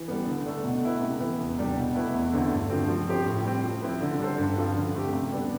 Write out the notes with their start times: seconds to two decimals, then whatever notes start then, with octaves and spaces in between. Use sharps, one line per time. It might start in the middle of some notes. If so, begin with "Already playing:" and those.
Already playing: E3
0.08 G3 B3
0.27 D3
0.46 A3 D4 A4
0.64 B2
0.83 A3 E4 B4
1.01 C3
1.20 E3 B3 E4
1.39 E2
1.58 C3 G3 D4 G4
1.77 B2
1.95 A3 E4 B4
2.14 E2
2.32 D3 A3 C4 E4
2.52 G2
2.70 D3 F3 A3 C4
2.89 F3
3.07 C4 G4 C5
3.26 A2
3.45 G3 C4
3.64 F3
3.82 C4 E4 B4
4.01 D3
4.20 G3 D4 A4 C5
4.38 G2
4.57 F3 C4 F4
4.76 D3
4.94 A3 C4 G4
5.13 C3
5.32 G3 B3 D4